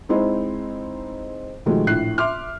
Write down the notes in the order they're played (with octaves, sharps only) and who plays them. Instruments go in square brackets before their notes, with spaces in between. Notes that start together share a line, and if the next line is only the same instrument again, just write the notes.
[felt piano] G#3 C4 D#4 E4 C5
B2 D#3 F3 G#3 A3
A#1 A2 F#6 C7
E5 C6 D6 F6